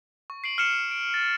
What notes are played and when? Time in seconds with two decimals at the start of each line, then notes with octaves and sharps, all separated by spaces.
0.30 C#6
0.44 C7 D7 F#7
0.58 F6 C7 C#7 E7
0.91 D7
1.14 A6